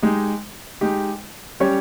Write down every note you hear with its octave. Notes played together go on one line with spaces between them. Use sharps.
G#3 D#4 G4
G#3 D#4 G4
G3 C#4 G4 C#5